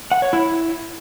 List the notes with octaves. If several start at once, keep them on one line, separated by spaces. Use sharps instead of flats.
F#5
C#5
E4